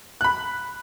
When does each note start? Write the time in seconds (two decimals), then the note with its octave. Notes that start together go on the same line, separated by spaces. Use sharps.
0.21 B5 F#6